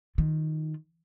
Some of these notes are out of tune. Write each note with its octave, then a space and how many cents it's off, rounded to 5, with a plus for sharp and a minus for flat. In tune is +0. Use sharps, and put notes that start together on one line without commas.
D#3 +0 F4 -5